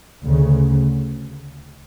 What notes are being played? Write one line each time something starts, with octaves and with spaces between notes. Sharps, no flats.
D2 C#3